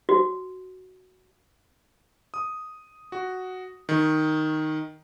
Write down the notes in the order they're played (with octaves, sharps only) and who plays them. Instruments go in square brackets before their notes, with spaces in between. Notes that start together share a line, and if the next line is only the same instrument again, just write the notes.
[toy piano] F#4
[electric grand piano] D#6
F#4
D#3